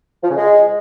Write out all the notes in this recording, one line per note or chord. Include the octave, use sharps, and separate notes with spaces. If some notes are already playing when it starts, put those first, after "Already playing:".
F3
C#3
G#3